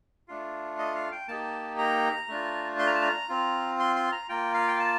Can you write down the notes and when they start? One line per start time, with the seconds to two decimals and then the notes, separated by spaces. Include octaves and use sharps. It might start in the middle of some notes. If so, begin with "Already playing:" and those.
0.28 A3 D4 F4
0.79 D#5
0.95 F5
1.12 G5
1.28 A#3 D#4 G4 A5
1.78 A#5
2.28 A3 D4 F4
2.79 C6
2.87 A#5
2.94 A5
3.02 A#5
3.29 C4 F4
3.80 C6
3.96 C6
4.12 A#5
4.29 A#3 F4 G5
4.54 F5
4.68 G5
4.80 A5